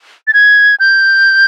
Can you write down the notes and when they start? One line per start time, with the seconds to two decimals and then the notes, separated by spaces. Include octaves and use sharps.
0.27 A6
0.34 G#6
0.80 G6